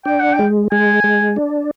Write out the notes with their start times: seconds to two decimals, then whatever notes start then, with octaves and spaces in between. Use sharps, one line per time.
0.05 D4 G5
0.20 F#5
0.33 G5
0.39 G#3
0.71 G#3 G#5
1.04 G#3
1.36 D4